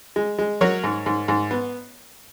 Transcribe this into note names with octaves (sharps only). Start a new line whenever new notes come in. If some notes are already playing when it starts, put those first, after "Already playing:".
G#3
G#3
F#3 A#4 C#5
G#2
G#2
G#2
B3